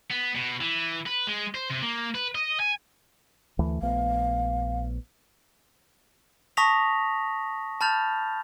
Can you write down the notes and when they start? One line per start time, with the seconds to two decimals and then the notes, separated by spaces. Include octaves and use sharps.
0.11 B3
0.36 B2
0.61 E3
1.06 B4
1.27 G#3
1.55 C5
1.70 C3
1.83 A#3
2.15 B4
2.35 D#5
2.60 G#5
3.59 D2 E3 A3
3.82 A#1 A3 B3 F5
6.57 A5 C#6 D#6 A#6 B6 F7
7.81 A5 B5 F6 G6 A6 F7